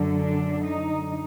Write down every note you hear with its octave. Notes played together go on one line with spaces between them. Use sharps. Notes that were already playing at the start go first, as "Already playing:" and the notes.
Already playing: F#2 D3
D4
D#4